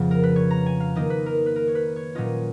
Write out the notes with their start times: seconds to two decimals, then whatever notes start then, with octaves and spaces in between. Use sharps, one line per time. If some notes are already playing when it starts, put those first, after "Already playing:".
Already playing: F2 C#3 F3 B3
0.11 A#4
0.23 B4
0.36 C#5
0.51 A#5
0.66 G#5
0.80 F5
0.95 D#3 A#3 D#4 D#5
1.10 B4
1.26 A#4
1.46 B4
1.56 A#4
1.67 C#5
1.75 B4
1.96 C#5
2.15 A#2 F#3 C#4 F4 D#5